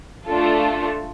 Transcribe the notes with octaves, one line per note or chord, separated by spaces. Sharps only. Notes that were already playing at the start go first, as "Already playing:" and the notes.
A3 D4 F4 A4